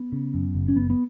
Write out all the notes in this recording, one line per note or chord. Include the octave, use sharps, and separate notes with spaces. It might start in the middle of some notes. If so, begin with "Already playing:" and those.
Already playing: B3
C#3
F#2
F#1
C#4
F#1 B3
B3